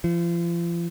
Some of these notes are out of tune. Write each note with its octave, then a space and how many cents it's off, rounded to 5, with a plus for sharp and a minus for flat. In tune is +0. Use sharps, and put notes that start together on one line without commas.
F3 -40